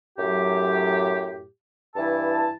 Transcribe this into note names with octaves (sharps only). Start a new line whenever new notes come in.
F#2 A2 F#3 G4
G2 E3 E4 A5